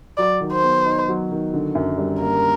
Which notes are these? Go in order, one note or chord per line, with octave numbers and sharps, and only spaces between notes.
F#3 D5
D#3
C5
B3
D#4
F#3
D#3
D3
F#2
G3
A#3 A#4